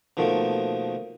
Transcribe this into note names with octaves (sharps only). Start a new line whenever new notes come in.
B2 D#3 F3 A3 A#3